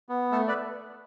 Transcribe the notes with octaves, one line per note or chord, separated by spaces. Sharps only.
B3
A3 A4
B4 D5